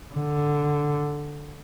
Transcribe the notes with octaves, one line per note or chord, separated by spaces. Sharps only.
D3